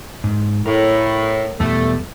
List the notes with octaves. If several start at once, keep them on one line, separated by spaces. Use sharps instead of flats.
G#2
A2 A#4
E2 B2 G3 A3